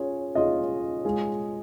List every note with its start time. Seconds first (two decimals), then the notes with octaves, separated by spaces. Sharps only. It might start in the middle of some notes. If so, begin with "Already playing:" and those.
Already playing: C#4 F4 G#4 C#5
0.35 C#4 F4 G#4 D#5
1.05 G#3 F4 G#4 F5